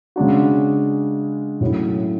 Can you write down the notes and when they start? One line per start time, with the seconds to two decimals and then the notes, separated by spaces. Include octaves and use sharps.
0.16 C#3 G#3 D4 F#4
1.61 A2 F#3 C#4 E4